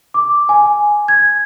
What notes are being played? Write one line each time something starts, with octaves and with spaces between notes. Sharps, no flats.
D6
G#5
G#6